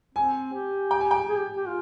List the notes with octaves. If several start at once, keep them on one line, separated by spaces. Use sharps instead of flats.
C4 G#5
G4
G5
G#5
G5
G#4
G4
G4
F4